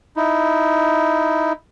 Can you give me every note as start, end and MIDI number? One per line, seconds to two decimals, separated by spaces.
0.16 1.53 63
0.16 1.53 64